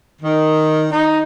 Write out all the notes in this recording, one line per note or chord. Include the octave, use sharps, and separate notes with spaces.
D#3
D#4